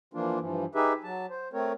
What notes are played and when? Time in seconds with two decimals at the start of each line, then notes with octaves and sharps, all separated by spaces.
0.14 E3 F3 A#3 D4 F4
0.40 G2 E3 F3
0.75 D#4 G4 G#4 B4 E5
1.04 F#3 A5
1.30 C5
1.53 A3 C4 A#4 C#5